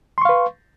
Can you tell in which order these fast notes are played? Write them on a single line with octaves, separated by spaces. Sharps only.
C6 C#6 F5 B4